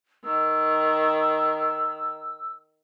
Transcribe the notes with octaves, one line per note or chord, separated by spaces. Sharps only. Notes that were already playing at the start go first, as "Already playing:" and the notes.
D#3 E6